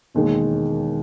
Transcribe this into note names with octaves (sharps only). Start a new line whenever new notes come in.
E1 D#2 D#3 G#3